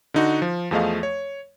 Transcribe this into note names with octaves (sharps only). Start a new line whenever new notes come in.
D3 D#4 F#4
F3
E2 F3 A3 G#4 D#5 F5
C#5